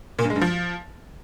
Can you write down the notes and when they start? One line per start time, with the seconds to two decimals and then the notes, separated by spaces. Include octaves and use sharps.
0.19 A#2
0.24 G2
0.30 G#3
0.36 G2
0.41 F3